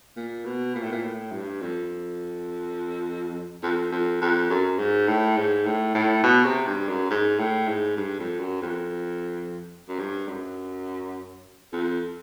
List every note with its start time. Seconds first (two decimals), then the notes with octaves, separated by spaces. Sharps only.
0.17 A#2
0.45 B2
0.75 A#2
0.83 A2
0.92 A#2
1.03 A2
1.32 G2
1.61 F2
3.63 F2
3.92 F2
4.21 F2
4.50 F#2
4.79 G#2
5.08 A2
5.37 G#2
5.66 A2
5.95 A2
6.24 B2
6.46 C3
6.67 G2
6.88 F#2
7.10 G#2
7.39 A2
7.67 G#2
7.97 G2
8.19 F2
8.40 F#2
8.62 F2
9.89 F#2
9.99 G2
10.28 F#2
11.73 F2